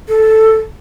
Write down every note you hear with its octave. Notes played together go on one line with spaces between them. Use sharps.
A4